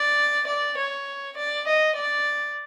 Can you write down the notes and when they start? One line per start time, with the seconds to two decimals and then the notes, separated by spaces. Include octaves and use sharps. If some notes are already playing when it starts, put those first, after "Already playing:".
Already playing: D5
0.47 D5
0.77 C#5
1.37 D5
1.67 D#5
1.96 D5